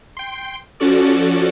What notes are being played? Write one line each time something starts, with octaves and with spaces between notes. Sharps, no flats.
G5 C6
F3 C#4 F#4 A4 D5